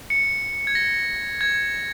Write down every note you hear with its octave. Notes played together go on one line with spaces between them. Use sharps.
C#7
G#6
A#6
G#6